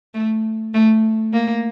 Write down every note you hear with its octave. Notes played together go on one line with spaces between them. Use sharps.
A3
A3
A#3